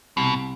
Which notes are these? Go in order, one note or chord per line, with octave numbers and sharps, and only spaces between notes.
C2 B2